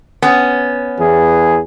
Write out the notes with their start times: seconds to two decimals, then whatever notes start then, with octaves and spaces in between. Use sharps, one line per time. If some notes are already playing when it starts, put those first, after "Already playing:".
0.22 B3 C#4
0.99 E2 E3 G#4